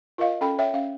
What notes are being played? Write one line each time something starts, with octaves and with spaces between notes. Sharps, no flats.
F4 A#4 D#5 F5
C#4 A4 G5 B5
C#5 E5 G5
C#4 F5